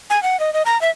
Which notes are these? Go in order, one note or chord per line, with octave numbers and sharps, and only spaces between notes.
G#5
F#5
D#5
D#5
A#5
E5